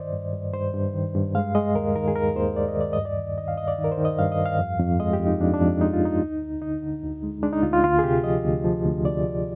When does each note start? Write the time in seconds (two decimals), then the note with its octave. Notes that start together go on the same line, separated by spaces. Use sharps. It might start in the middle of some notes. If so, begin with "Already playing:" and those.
Already playing: G2 D#3 C5 D5 D#5
0.13 G2
0.33 G2
0.53 G2 C5
0.74 G2
0.94 D#3
1.15 G2
1.35 G#3 F5
1.55 G#3 D#5
1.75 D#2 A#4
1.96 D#3 A#4
2.08 G#4
2.16 D#2 A#4
2.36 D#2 C5
2.56 D#2 D5
2.68 D#5
2.77 D#2 D5
2.93 G2 D#5
3.05 D5
3.17 D#3
3.38 D#3 D#5
3.48 F5
3.57 G2 D#5
3.68 D5
3.78 D#3
3.84 A#4
3.92 C5
3.98 D#3
4.05 D#5
4.19 G2 F5
4.32 D#5
4.39 G2
4.46 F5
4.59 F2
4.79 F2
5.00 G#3 D#5
5.13 G4
5.20 F2
5.26 D#4
5.41 F2 D4
5.54 D4
5.61 F2
5.80 G#3 D#4
5.93 F4
6.01 F2 D#4
6.21 D2
6.42 D2
6.61 D3 D#4
6.82 D3
7.02 D2
7.23 G#3
7.43 G#3 D4
7.53 D#4
7.63 D2 F4
7.73 F4
7.84 D2 F4
7.99 G#4
8.04 C3 G4
8.24 F3 D#5
8.45 D2
8.65 F3
8.85 D2
9.05 D2 D5
9.25 D2